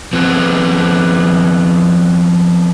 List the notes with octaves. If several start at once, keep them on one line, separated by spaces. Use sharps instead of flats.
F3 B3 C4